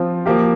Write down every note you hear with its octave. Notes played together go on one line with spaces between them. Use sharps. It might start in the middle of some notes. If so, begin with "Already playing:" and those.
Already playing: F3 C4 F4
F3 A#3 G4